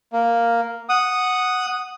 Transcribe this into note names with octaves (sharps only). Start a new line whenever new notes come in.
A#3
F#5 D#6